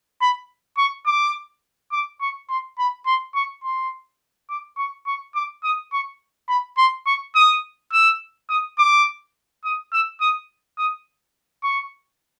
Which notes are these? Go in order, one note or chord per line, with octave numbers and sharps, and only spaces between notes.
B5
C#6
D6
D6
C#6
C6
B5
C6
C#6
C6
D6
C#6
C#6
D6
D#6
C#6
B5
C6
C#6
D#6
E6
D#6
D6
D#6
E6
D#6
D#6
C#6